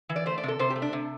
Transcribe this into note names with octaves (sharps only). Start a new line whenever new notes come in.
E3
D5
A3 C5
D5
C3 A4
C3 C5
G4
A3
D4
C3